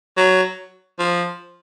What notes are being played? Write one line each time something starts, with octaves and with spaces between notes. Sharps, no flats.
F#3
F3